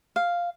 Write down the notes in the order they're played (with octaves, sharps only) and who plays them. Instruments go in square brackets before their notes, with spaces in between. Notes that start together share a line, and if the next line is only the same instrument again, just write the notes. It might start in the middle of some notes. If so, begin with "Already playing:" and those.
[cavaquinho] F5